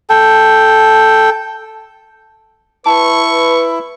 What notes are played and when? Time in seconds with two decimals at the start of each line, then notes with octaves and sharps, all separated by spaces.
0.10 A4 G5
2.86 E4 B4 A5 C#6